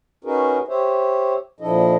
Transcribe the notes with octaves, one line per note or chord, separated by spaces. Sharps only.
C#4 D#4 F#4 G#4 A#4 B4
G4 C5 C#5 E5
A#2 F3 D4 E4 A4 D#5